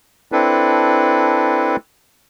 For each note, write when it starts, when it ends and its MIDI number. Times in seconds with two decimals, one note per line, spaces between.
0.32 1.76 60
0.32 1.76 62
0.32 1.76 64
0.32 1.76 69
0.32 1.76 71